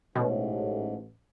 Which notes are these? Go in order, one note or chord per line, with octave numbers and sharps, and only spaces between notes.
A1 G#2 B2